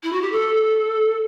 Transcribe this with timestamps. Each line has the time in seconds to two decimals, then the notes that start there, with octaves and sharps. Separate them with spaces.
0.03 E4
0.12 F#4
0.21 G4
0.31 A4